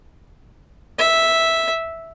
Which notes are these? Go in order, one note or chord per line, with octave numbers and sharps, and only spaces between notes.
E5